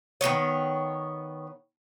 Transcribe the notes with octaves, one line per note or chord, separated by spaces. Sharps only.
D#3 F#3 B3 C#5